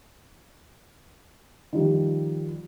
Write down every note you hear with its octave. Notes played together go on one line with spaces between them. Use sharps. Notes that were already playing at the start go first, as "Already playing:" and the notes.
D#3 F3 G3 G4